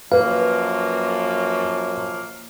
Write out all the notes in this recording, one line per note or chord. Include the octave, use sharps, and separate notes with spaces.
F#2 F3 A#3 B4 F5